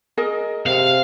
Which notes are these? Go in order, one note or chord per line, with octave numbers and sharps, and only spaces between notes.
G#4 A#4 D#5
C3 F5